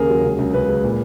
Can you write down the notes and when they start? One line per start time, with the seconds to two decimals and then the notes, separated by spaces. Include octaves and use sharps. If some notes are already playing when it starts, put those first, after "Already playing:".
Already playing: D#2 C#3 A#3 G#4 A#4
0.10 F#3
0.24 C#2
0.39 C#2
0.53 C#3 B4
0.68 G#3
0.84 A#2